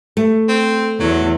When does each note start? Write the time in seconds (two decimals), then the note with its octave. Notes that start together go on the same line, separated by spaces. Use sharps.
0.17 A3
0.48 C4
1.00 E2 F#3